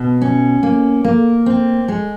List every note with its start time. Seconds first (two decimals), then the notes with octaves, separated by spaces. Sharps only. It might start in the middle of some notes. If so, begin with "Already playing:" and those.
Already playing: B2
0.22 C#4
0.63 A#3
1.04 A#3
1.46 C4
1.88 G#3